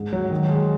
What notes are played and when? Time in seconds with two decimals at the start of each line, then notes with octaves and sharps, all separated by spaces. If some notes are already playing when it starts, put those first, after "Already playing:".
Already playing: G#2
0.13 F#3
0.31 D#3
0.49 G#3